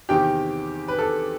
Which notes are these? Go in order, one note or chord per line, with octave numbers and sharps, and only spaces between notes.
E2 C3 D#3 G4 G5
B4
A4